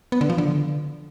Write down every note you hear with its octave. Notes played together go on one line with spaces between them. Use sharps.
B3
D3
F3
D3